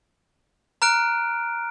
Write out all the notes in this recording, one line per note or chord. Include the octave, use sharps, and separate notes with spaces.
A#5 F6 F#6 D7